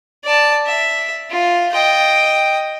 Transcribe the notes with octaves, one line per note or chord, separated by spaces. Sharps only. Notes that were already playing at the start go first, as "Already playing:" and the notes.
D5 A5
E5
F4
D#5 G5